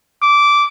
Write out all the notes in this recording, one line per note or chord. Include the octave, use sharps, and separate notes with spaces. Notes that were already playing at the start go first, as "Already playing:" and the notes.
D6